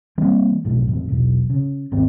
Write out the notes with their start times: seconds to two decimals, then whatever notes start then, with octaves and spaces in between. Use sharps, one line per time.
0.18 E3 G3 A#3 C4
0.65 B1 F2 A2
0.88 A1 F2
1.09 E1 B1
1.50 C#3
1.92 G#1 D#2 C4